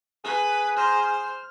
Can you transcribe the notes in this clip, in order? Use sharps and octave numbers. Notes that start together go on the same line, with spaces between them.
G#4 B4
C5 A#5 C6 F6
F6